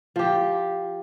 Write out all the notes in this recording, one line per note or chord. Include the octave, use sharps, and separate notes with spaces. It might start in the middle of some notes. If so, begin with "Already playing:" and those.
F3 G4